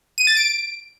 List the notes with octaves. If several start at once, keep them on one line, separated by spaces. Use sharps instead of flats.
D#7
A6
D7